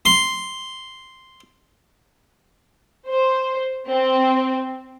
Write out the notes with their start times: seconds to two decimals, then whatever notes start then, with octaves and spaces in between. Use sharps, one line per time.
0.05 C6
3.09 C5
3.88 C4